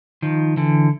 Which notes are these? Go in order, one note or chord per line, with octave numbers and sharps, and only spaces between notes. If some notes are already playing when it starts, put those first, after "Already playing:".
D#3 F3
D3 E3